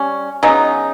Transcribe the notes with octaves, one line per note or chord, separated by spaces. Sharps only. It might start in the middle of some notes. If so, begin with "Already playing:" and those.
Already playing: G3 C#4
C#3 F#3 B3 D#4